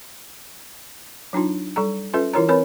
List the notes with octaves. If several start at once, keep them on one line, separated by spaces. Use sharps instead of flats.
F#3 D4 D#4 F4
G3 A4 A#5
C#4 F4 A4 B4 E5
E3 E4 F4 A#4 C#5 A#5
C4 A#4 B4 C#5 B5